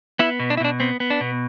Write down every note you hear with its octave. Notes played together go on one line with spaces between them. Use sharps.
B3 E4
B2
D4
E4
B2 D4
B3 C4
B3
D4
B2